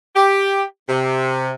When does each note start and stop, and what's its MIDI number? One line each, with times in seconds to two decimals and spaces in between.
0.16 0.62 67
0.89 1.51 48